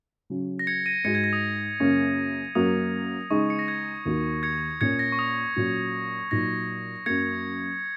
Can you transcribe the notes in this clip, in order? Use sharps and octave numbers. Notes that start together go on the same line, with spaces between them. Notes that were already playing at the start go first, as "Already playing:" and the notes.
C#3 F#3 C#4
A#6
G#6 C#7
A#6 D#7
G#2 G#3 F#4 G#6 C#7
G#6 C#7
A#6
D#6
F#2 C#3 A#3 C#4
F#2 F#3 A#3 F#4 D#6
C#3 G#3 D#4 C#6
C#7
A#6
G#6 C#7
D#2 D#3 A#3 F#4
G#6 C#7
A#2 A#3 C#4 G#6 C#7
A#6
C#6
D#6
A#2 F#3 C#4 F#4
A#2 F#3 D#4 A#6
F#2 F#3 A#3 G#6 C#7